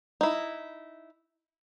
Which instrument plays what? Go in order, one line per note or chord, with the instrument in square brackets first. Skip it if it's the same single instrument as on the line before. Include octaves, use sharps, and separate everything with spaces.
[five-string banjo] D#4 E4